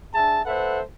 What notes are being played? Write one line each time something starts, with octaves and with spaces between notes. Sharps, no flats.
D4 G#4 E5 A5
A2 A4 B4 C5 E5 F#5